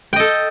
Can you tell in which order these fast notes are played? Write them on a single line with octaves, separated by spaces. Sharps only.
G5 D#5 A4